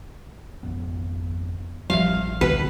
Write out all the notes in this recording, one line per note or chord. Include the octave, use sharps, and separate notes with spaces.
G#1 F2 B3
A1 F#2 F3 G3 E5 F5
D2 B2 B4